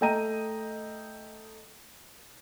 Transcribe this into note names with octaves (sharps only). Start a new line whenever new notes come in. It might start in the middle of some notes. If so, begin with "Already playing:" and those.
A3 D#5 G5 A#5 D#7